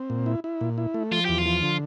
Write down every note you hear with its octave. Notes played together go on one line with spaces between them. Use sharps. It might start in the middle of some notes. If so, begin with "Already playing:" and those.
Already playing: C4
A#2
E4
E4
A#2
E4
A3
F3 F4
E2 G4
F4
F3
D3